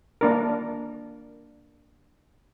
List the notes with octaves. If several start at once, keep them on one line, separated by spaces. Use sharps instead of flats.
A#3 D4 A#4